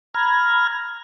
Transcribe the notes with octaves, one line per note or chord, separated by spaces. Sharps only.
A#5 B5 F6 G#6